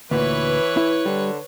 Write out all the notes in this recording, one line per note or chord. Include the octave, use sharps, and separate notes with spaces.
D2 A#2 E3 B4 C#5
E4
D3 G3